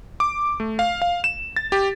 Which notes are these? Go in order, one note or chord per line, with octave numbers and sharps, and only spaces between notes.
D6
A3
F5
F5
E7
A6
G4